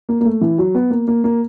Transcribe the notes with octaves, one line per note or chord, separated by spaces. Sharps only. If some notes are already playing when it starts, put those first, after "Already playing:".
A#3
A#3
A3
E3
F#3
B3
A#3
A#3
A#3